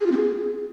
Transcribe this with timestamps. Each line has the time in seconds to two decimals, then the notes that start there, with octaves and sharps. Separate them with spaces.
0.01 G#4
0.06 F4
0.12 C4
0.17 G#4